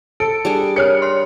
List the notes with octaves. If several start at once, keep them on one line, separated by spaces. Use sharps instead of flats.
A4 D7
G3 D4 G#4
A#4 C#5 F6 C#7
C#5 C6